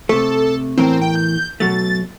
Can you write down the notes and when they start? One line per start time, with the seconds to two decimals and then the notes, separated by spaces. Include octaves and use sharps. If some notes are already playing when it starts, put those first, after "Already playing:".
0.09 C3 A3 A4
0.77 E2 A2 C4 A#4
1.01 G5
1.15 G6
1.60 B2 F#3 A3 A6